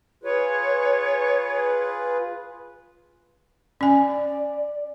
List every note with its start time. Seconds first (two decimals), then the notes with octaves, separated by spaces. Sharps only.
0.24 F4 G#4 B4 C#5
3.81 C#4 D5 G#5